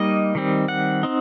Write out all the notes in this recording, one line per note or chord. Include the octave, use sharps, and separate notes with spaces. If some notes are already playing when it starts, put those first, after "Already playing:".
Already playing: G3 A#3 D#4 D#5
D#3 G3 C4
F#5
C4 D#4